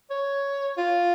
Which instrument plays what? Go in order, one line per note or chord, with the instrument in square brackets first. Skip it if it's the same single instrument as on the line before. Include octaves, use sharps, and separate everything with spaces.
[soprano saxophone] C#5
F4